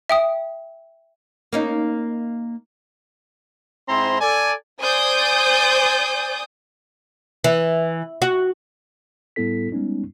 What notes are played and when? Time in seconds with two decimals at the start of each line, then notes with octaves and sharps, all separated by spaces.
0.09 E5 G5 D#6
1.52 A#3 C#4 D#4
3.89 G#2 C4 E4 C5 A#5 C6
4.21 A4 D5 G#5
4.81 C5 D5 G#5 D#6 G6
7.44 E3
8.22 F#4
9.36 A2 G3 B3 E4 A4 B6
9.72 G3 G#3 B3 C#4 D#4